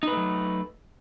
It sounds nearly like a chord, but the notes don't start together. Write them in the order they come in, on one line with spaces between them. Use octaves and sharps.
D#4 B4 A3 F#3